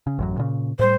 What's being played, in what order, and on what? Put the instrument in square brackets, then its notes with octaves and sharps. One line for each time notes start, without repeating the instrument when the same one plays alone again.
[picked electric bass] C#3
A1 F#2 F#3
A#2 C#3
[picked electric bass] A2 G3 [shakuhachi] C5